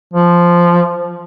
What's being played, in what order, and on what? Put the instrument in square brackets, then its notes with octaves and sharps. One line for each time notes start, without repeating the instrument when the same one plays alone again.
[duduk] F3